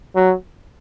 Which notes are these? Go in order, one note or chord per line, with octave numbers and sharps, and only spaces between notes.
F#3